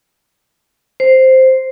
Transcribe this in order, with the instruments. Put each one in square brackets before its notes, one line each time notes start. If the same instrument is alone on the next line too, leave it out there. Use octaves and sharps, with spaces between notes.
[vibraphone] C5